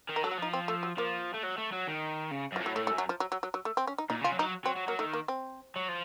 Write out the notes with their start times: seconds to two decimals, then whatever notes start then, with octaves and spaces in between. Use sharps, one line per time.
0.09 D#3
0.16 A#4
0.23 F#3 A4
0.31 F#4
0.38 F3 D#4
0.53 C4
0.68 A3
0.83 F#3
0.97 F3 A#3
1.34 A3
1.43 F#3
1.58 A3
1.72 F#3
1.87 D#3
2.31 C#3
2.52 F#2
2.56 F3
2.61 A2
2.66 F#3
2.76 A2 A3
2.87 A3
2.92 F#2
2.98 F#3
3.09 F3
3.20 F#3
3.32 F#3
3.43 F#3
3.54 F#3
3.65 A3
3.77 C4
3.87 C#4
3.98 D#4
4.10 A#2 D#4
4.21 C#3 F4
4.32 F#3
4.39 F3 D#4
4.43 F#3
4.65 F#3 C4
4.76 F#3
4.88 F#3 A#3
4.99 D#3 A3
5.13 A#3
5.28 C4
5.76 F#3
5.88 F3